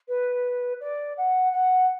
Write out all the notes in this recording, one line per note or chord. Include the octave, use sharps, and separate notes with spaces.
B4
D5
F#5
F#5